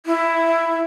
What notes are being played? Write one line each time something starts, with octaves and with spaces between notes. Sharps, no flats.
E4